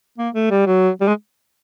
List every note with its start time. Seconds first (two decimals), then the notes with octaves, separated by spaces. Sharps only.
0.18 A#3
0.35 A3
0.51 G3
0.67 F#3
1.01 G3
1.08 G#3